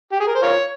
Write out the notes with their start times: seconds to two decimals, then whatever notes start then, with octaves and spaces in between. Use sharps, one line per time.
0.12 G4
0.20 G#4
0.27 A#4
0.35 C5
0.42 F4 A#4 C#5